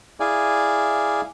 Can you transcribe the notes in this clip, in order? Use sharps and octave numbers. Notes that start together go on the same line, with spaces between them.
E4 G#4 D5 F5 G#5